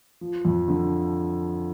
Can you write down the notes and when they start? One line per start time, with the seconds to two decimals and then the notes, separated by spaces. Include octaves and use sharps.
0.21 F3
0.45 F2
0.68 D3